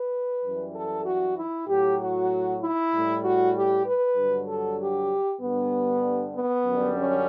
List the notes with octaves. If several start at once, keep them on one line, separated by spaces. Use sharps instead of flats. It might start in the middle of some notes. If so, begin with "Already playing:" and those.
Already playing: B4
F#2 E3 G3
A4
F#4
E4
A2 F#3 G4
F#4
E4
A2 G3
F#4
G4
B4
G2 D3 F#3
A4
G4
G2 D3 G3 B3
B3
F#2 D3 G3
C#4